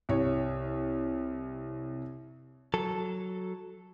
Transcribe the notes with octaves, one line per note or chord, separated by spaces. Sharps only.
C2 C#5
F#3 A4